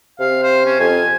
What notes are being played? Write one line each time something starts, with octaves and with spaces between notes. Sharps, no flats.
C3 F5
C5
C#4
F2 G#5